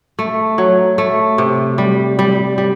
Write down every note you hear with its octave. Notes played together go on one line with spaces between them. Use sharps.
A3
F#3
A3
C3
G3
G3
G3